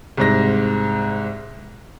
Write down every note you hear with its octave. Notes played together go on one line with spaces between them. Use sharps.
C2 G#2 A#6